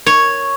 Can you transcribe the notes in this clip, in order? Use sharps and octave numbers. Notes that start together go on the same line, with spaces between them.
C#5